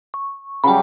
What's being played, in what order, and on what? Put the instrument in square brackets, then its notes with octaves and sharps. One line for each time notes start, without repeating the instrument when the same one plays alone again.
[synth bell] C#6
[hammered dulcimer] C#3 F#3 G3 [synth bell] A5 B5